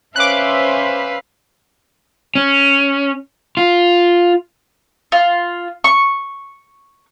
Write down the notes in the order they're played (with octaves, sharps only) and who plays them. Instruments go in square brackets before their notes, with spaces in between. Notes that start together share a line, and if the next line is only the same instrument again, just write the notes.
[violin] C#4 [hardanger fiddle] B4 F5 [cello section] C5 E5 [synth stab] D6 F#6
[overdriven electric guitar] C#4
F4
[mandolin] F4
C#6